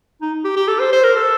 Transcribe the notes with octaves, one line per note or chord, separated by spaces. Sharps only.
D#4
G4
G4
A4
C5
C5
A#4
A4